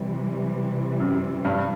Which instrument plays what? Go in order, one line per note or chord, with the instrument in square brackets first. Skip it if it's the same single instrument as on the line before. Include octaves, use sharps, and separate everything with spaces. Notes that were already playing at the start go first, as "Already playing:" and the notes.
Already playing: [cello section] C3 E3 G3
[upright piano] F#2
G2